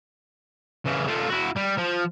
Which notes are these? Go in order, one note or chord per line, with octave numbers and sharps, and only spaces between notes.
C#3 E3
A3 F4
E4 F#4
G3
F3